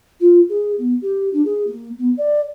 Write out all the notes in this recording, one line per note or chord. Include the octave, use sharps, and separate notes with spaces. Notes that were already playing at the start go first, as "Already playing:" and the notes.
F4
G#4
B3
G4
D4
G#4
A#3
B3
D5